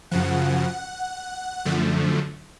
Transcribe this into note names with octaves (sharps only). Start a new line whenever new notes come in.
F#2 C#3 F3 F#5
F#2 D3 F3 A3